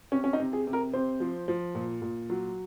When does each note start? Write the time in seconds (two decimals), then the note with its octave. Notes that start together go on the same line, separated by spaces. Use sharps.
0.12 C3 C#4
0.24 C#4
0.33 D#4
0.40 C3
0.53 G#4
0.67 C3
0.73 A#4
0.93 C3 C5
1.20 F3
1.48 F3
1.75 A#2
2.02 A#2
2.30 F#3